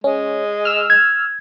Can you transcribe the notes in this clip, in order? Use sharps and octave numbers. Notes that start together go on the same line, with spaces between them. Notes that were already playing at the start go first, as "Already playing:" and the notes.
G#3 C#4
E6 F6
G#6